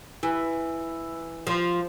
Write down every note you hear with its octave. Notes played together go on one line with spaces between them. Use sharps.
E3
F3